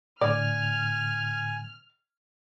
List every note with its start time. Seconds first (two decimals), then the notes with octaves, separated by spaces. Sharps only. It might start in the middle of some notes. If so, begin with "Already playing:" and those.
0.21 A2 D3 D5 G#5 F6